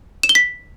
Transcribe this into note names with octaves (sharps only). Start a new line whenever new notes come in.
E7
G7
B6